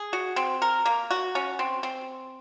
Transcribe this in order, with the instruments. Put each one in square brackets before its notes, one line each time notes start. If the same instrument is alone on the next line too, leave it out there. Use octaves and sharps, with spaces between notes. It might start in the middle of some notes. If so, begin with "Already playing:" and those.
Already playing: [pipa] G#4
F#4
C4
A#4
A#3
F#4
C#4
C4
C4